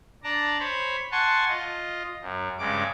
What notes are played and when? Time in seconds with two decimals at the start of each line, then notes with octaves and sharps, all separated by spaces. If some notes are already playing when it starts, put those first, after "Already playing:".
0.23 D4 D5 A5 A#5
0.59 C5 C#5 B5
1.12 F#5 G#5 A5 C6 C#6
1.49 F4 D#5
2.22 F#2
2.59 G2 C#3 G#3 D6